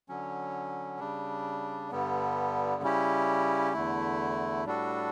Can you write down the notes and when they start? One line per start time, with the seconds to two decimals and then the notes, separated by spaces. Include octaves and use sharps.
0.09 D3 F#3 C#4
0.99 C#3 G3 D4
1.91 G2 D3 G3 B3
2.82 C#3 G3 C#4 E4 G4
3.73 E2 D3 A3 E4
4.66 A2 G3 D4 F#4 A4